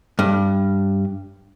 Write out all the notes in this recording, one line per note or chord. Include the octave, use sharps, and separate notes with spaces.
G2